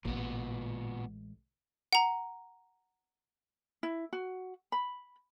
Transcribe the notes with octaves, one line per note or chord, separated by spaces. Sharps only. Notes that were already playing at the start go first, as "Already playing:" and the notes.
A1 A#2 G#3 B3
F#5 A#5
E4
F#4
B5